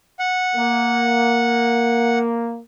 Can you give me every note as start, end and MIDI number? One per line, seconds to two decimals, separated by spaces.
0.19 2.19 78
0.55 2.59 58